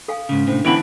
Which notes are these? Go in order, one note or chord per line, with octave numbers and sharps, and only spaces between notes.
A4 F5 G#5
G#2 C#3 C#4
A2 C3 D4 C5
D3 E3 B3 C#5 G5 B5